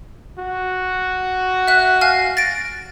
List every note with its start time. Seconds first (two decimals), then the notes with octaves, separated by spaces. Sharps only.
0.39 F#4
1.68 E5 F#6
2.01 F5 G#5 F6
2.37 A6 A#6 D7